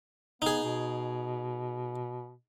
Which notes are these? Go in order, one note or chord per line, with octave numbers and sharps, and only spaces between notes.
B3 D#4 G#4
B2